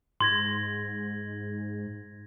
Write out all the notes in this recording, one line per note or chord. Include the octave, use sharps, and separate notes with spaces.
G#2 C6 G#6 A#6